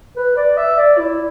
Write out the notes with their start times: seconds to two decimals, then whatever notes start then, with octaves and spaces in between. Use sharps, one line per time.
0.16 B4
0.36 D5
0.57 E5
0.78 D5
0.98 E4